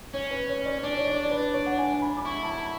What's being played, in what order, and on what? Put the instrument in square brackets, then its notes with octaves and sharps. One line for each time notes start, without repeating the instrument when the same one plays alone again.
[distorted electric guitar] C#4 [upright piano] C#5
[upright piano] B4
C#5
D5
[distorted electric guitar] D4 [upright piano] D5
[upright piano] C#5
D5
B4
C#5
F#5
G#5
B5
D6
[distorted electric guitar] E4 [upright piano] C#6
[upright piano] A5
B5